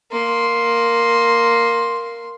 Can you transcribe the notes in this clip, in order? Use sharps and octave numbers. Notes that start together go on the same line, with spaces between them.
A#3 C6